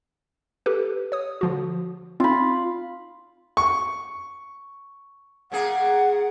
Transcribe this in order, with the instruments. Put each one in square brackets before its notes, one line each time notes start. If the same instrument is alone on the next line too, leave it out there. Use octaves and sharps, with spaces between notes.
[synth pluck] G4 A4 B4
C#5 D#6
D3 F3 F#4
[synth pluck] C4 D#4 [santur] F4 B5
[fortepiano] C#6
[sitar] C#3 A#3 G#4 [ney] F#5